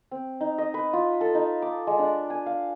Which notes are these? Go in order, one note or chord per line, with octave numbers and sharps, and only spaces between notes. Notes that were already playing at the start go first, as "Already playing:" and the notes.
C4
D#4
D#5
B4
F4
A4
D#4
D6
G#3
D4
G#5
F5